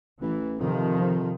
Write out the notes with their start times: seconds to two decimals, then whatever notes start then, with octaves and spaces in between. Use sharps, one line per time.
0.22 A1 E3
0.60 F2 C3 D#3 F3
1.01 F2